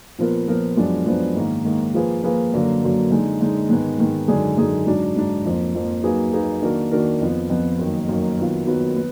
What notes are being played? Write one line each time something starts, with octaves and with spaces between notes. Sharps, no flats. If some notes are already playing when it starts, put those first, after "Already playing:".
A#2 F3 B3 F4 A#4
A#2 F3 B3 F4 A#4
F#2 F3 G#3 B3 D4
F#2 F3 G#3 B3 D4
G#2 D#3 A#3
G#2 D#3 A#3
F3 A#3 F4 G#4 B4
F3 A#3 F4 G#4 B4
F#2 D3 F#3 A#3
F#2 D3 F#3 A#3
D3 G#3 D#4
D3 G#3 D#4
G#2 D#3 G#3 B3
G#2 D#3 G#3 B3
F#2 D3 G#3 D#4 G#4
F#2 D3 G#3 D#4 G#4
G#2 F#3 D4
G#2 F#3 D4
F2 F3 A#3
F2 F3 A#3
F#3 A#3 D#4 G#4 B4
F#3 A#3 D#4 G#4 B4
D#3 A#3 D4 F#4 A#4
D#3 A#3 D4 F#4 A#4
F2 F3 B3
F2 F3 B3
F#2 D#3 A#3
F#2 D#3 A#3
D#3 F#3 B3 F4
D#3 F#3 B3 F4
B3